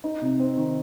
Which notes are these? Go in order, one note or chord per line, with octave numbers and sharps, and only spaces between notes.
D#4
C3
C4
D#3